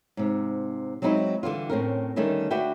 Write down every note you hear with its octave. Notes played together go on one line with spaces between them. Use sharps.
G#2 C3
F#3 G#3 C4 D#4 E4
D3 E3 G3 F4
A2 C4 C#4 A#4
D3 D#3 G3 A3 C#4 D4
D2 D4 F#4 B4 E5 G5